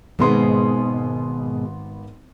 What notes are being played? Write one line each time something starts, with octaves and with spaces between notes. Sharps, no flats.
G#1 G#2 B2 G#3 B3 C6